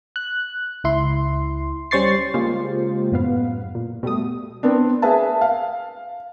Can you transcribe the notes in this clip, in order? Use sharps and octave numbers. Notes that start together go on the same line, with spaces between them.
F#6
C#2 E4 C6
G3 C#4 C5 C#6 A6 C7
C#3 G#3 A#3 F4 G4 C5
F#2 A2 B3 B4 F5
A#2
B2 G3 A3 D#6
B3 C4 D4
G#4 A#4 B4 E5 A5
F5